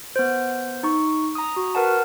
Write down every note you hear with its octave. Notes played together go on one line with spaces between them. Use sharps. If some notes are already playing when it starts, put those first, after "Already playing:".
B3 C5
D#4 C#6
A#5 D#6
F#4
A#4 B4 F#5 A5